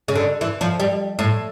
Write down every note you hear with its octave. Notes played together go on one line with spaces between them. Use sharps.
C#3
D3
E3
F3
G3
A2